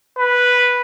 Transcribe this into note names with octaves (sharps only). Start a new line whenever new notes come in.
B4